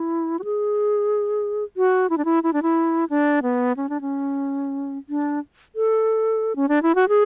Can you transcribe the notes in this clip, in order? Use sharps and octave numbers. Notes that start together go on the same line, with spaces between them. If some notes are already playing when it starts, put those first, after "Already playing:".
Already playing: E4
F#4
G#4
F#4
E4
D4
E4
E4
D4
E4
D4
B3
C#4
D4
C#4
D4
A4
C#4
D4
E4
F#4
G#4